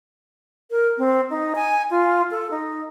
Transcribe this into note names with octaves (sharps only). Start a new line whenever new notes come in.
A#4
C4
D#4
G#5
F4
A4
D#4